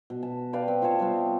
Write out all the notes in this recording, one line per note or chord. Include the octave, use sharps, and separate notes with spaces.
B2
A5
G4 B4 D5 F5
C4
F4 C5 C#5 A5
C3 G3 B3 C4